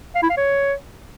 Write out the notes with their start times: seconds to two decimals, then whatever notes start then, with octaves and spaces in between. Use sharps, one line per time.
0.15 F5
0.23 E4
0.30 F5
0.37 C#5